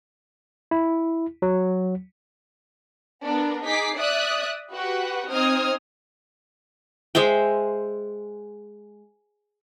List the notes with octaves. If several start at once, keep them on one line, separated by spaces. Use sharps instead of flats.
E4
F#3
B3 D4 A#4
D#4 G#4 D6 B6 C7
D5 E5 D#6 F#6
F#4 G4 B4 F#5
C4 D#4 C5 D#6 F6 G#6
G#3 C5 E5 G5